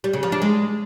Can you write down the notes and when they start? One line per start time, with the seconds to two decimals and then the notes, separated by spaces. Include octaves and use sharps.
0.04 G3
0.13 C#3
0.23 F3
0.32 D4
0.42 G#3